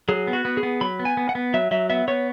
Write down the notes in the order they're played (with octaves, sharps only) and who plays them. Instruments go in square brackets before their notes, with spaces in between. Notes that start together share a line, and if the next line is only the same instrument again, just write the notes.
[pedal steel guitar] F#3 G#4
B3
F#4
B3
G#4
B3
F#3 B5
B3
G#5
B3
F#5
B3
F#3 E5
F#3 E5
B3 E5
B3 C#5